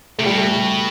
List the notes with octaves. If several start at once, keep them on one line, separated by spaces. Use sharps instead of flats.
C3 A3
B2 G3
A3
G3